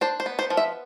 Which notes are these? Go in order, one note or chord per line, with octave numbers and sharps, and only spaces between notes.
D4 C5
C5
B3
C5
F3
E5